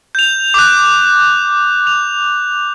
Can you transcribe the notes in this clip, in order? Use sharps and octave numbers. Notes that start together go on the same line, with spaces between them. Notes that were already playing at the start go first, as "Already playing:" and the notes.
G6 F7
D6 F#6
F7